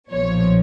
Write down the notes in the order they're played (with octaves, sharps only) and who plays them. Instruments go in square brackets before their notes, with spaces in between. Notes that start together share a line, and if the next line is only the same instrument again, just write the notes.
[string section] B1 A#2 F3 C#5